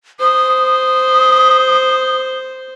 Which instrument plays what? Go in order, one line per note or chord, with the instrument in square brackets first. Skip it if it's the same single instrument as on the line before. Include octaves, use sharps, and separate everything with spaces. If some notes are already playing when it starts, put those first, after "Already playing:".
[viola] C5 [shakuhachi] D#6